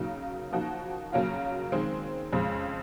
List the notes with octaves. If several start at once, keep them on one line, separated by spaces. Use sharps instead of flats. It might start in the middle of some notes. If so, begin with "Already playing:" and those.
Already playing: C#3 F#3 A#3 D#4
F3 A#3 D#4 F#4
C#3 F#3 A#3 C#4 F4
D#3 G#3 C4
F2 C#3 G#3